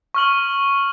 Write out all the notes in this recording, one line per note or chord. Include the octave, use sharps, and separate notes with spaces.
C#6 F6 F#7